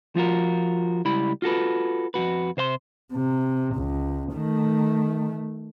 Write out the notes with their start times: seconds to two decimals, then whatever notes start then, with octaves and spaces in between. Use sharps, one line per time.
0.15 F3 F4 F#4 A#4
1.05 C#2 G3 E4 B5
1.42 F4 F#4 A4 B4
2.14 F2 G#2 F#4 B4
2.57 C3 C5 F5 C6
3.12 C3
3.76 C#2
4.33 D#3 A3